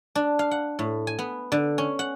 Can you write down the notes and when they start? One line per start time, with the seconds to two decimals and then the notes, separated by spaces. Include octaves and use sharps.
0.15 D4
0.39 F5
0.51 F#5
0.79 A2
1.07 G#5
1.19 B3
1.52 D3
1.78 C#4
1.99 F#5